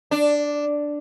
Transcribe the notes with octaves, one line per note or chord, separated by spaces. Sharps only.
D4